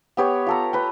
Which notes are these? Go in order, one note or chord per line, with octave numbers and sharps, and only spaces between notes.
B3 G4 C#5 G5
F4 A4 A#5
B4 G5